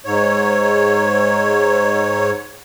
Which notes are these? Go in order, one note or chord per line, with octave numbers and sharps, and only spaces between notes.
G#2 C#5